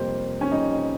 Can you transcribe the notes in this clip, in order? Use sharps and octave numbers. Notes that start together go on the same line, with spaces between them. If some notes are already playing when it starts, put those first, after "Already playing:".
Already playing: F2 C3 G3 A#3 C5
C#4
F2 C3 G3 A#3 D#4